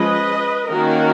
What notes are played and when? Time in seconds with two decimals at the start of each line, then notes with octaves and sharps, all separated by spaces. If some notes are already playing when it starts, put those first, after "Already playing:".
Already playing: F3 G#3 C#4 B4 D#5
0.69 D#3 A#3 C#4 F#4 A#4